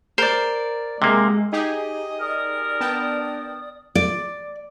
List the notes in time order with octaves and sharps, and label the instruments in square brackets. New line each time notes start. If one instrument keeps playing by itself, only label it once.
[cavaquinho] A#4 D5 [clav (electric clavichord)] C5
[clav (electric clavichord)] C3 A#3 [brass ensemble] G#3
[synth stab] D#4 G4 G#4 [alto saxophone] D#5
[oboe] A#4 [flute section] D5 D#6
[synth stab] B3 G5 A5 [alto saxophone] D4
[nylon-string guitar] D5